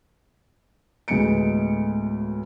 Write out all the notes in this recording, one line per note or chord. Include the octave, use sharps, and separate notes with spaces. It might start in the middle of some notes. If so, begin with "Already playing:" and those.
D2 A2 G#3 B3 C#7 D7